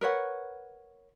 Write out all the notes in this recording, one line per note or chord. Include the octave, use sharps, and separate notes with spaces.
A#4 B4 C#5 F#5